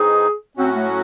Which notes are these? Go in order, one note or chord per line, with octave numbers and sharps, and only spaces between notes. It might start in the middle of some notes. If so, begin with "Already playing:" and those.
Already playing: E3 C4 D#4 G#4
A2 F#3 C4 C#4 F#4
A3